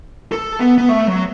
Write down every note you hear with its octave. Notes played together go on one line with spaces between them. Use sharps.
A4
B3
B3
A3
F#3